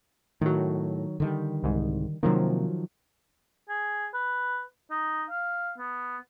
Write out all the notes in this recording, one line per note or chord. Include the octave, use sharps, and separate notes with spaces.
A2 D#3 F#3
D3 D#3 G3
C2 G#2
C3 D#3 F3 F#3 A#3
G#4
B4
D#4
F5
B3